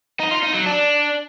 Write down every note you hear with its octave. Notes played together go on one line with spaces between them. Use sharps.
D#4
F4
D#4
F#3
D4